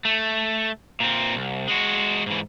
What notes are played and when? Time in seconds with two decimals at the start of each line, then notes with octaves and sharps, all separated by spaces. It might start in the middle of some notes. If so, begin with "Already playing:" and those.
0.05 A3
1.00 A#2 C4
1.36 C2
1.68 G#3 F#4
2.26 G#2 E3